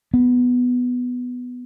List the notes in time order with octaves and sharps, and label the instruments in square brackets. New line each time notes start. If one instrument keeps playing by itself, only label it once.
[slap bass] B3